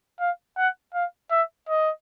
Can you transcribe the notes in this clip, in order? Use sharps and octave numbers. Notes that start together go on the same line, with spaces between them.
F5
F#5
F5
E5
D#5